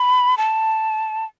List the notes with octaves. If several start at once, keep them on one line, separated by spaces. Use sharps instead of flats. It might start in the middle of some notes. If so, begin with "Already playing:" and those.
Already playing: B5
A5